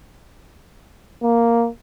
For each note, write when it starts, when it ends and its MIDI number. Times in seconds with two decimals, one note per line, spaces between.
1.23 1.68 58